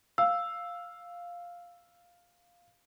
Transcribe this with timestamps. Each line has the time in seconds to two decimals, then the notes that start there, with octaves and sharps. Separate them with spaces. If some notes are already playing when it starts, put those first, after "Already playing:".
0.18 F5 E6